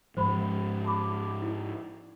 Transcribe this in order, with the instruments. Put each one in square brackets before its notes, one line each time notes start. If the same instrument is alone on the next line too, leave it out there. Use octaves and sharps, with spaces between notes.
[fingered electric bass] G#2 F3 [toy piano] C5 B5
[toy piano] A5 B5 D6
E4